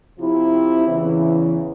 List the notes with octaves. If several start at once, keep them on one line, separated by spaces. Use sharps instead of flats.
C3 F3 C4 E4
E2 C#3 E3